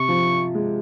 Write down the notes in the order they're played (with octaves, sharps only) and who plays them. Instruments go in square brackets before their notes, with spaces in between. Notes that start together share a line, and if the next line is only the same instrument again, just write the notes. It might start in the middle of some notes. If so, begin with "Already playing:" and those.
Already playing: [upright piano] C3 [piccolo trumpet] C#6
[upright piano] F3
G#3